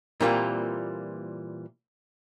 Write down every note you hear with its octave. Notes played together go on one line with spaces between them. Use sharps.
A#2 E3 G3 A#3 C4 F4